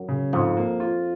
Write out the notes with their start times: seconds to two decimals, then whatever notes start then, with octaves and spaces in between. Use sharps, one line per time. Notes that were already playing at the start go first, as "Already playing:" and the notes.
Already playing: F#2 F#3
0.09 C#3
0.33 F2 G#2 F3
0.57 A#3
0.80 F4